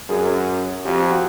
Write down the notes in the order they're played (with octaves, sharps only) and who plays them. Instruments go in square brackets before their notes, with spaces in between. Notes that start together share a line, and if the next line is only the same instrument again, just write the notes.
[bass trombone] F#2 [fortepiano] G#4
[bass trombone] F2 [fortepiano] G4
[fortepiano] G4
F#4